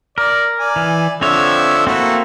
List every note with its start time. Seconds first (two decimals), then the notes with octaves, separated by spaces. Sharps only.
0.18 A#4 D5
0.59 D5 G#5
0.76 E3
1.21 D3 F3 C4 C#5 E5
1.87 A3 A#3 C4 E4 F#4